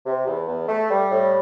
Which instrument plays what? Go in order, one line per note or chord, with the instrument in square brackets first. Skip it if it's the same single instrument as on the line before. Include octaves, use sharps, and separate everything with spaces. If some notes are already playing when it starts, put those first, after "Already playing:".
[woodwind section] C3
E2
E2
A3
G3
A2